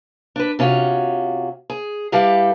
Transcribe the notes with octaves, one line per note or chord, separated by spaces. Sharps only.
D4 B4
C3 C#4 F4 F#4
G#4
G3 E4 G4 A4 B4 F5